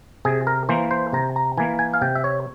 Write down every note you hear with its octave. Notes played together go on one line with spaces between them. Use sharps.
C3 G#4
A#4
E3 A#3 C5
C5
C3 A#5
A#5
E3 A#3 G#5
G#5
F5
C3 G5
E5
C#5